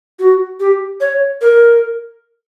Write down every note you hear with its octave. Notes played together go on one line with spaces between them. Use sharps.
F#4
G4
C#5
A#4